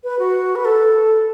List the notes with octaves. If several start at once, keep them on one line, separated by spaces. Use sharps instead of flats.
B4
F#4
B4
A4